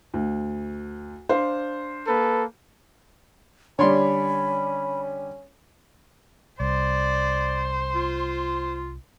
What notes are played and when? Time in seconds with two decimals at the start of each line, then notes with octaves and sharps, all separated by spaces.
0.14 D2
1.29 D4 C5 F5
2.07 A#3 A4 B4
3.79 D3 G3 C#4 C#5 D5 B5 C6
6.60 C2 C5 D5
7.95 F4